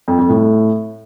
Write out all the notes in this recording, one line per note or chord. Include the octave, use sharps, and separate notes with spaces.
F2
F2
A2